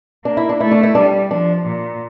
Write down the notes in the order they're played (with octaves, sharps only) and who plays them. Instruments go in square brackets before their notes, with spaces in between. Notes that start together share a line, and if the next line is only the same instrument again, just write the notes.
[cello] A#3 [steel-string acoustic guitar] D4
[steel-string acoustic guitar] E4
D4
[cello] A3 [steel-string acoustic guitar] E4
[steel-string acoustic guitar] D4
E4
[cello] G3 [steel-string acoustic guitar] D4
[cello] F3 [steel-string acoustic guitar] D4
[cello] A#2